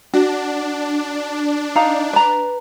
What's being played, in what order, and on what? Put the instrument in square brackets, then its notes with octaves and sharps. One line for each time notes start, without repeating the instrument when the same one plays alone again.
[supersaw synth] D4 [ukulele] F#4
[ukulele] D#4 F5 A#5
B4 A#5